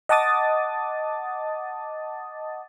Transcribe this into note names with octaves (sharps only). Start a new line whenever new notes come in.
D#5 F#5 A5 D6 D#6 A6